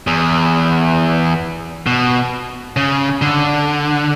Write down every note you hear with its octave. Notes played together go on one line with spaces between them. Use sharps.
E2
B2
C#3
D3